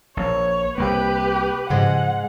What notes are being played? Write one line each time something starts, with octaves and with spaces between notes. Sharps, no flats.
A#1 C#5
C2 A#3 G4 B4
G#2 C#3 E3 F3 G#3 D#5 F#5